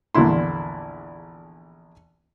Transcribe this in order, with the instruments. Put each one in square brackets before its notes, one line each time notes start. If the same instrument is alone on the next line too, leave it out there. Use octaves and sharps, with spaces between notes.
[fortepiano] A#1 E2 D3 A#3 E4 C6